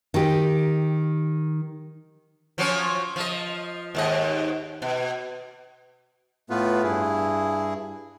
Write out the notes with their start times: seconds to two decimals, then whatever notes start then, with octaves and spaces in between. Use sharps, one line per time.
0.14 D#3 G4
2.58 F3 F#3 C#4
3.16 F3 D#5
3.95 D#2 G#2 D#5
4.82 B2
6.50 A2 A3 B3 F4 B4
6.83 G2 E4 G#4